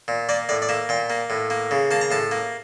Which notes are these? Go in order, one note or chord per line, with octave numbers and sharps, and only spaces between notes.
A#2
A#3 D5
A2 D5
D5
A#3 E5
A#2 G5
A#3
A2
A#3
C#3
A#3 A5
A#5
A2 A5
A#3